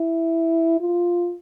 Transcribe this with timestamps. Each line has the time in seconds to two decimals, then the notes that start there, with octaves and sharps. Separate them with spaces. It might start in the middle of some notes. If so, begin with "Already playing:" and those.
Already playing: E4
0.80 F4